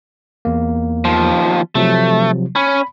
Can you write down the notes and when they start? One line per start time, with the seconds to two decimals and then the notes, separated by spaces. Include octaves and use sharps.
0.45 E2 A#3
1.05 D#2 F3
1.75 C3 F3 F#3 A3
2.56 C#4 B5